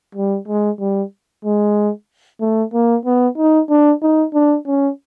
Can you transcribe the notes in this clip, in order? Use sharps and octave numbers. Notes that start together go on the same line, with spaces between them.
G3
G#3
G3
G#3
A3
A#3
B3
D#4
D4
D#4
D4
C#4